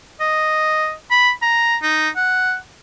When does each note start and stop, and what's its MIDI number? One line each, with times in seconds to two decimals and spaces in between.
0.20 0.92 75
1.11 1.31 83
1.42 1.76 82
1.83 2.09 63
2.16 2.55 78